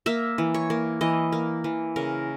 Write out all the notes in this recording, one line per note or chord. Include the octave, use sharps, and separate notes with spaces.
A#3 E5
E3
C#5
A#3
E3 D#5
A#3
E3
C#3 A#4